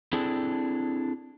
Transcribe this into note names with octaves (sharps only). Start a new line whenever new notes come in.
C4 D4 E4 G#4 A4